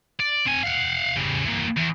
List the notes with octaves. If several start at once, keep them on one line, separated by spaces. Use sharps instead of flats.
D5
C4 G#5
F5 F#5
C#3 G3
E3 A#3
E2